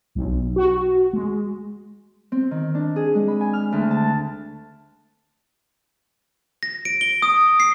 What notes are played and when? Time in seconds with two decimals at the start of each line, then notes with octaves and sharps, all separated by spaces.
0.15 B1
0.56 F#4
1.13 G#3
2.32 C4
2.51 D#3
2.75 D4
2.96 G#4
3.15 G#3
3.28 B5
3.41 G#5
3.53 F6
3.72 D2
3.91 A5
6.63 A#6
6.85 D7
7.01 G7
7.22 D#6
7.60 C7